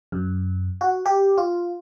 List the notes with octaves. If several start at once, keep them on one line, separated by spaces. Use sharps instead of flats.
F#2
F#4
G4
F4